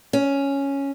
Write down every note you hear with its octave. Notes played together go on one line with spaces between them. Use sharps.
C#4